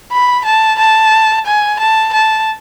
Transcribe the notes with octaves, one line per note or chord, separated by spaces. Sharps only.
B5
A5
A5
G#5
A5
A5